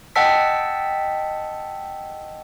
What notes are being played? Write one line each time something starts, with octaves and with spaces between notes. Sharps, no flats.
D#5 F#5 G5 A5 E6 B6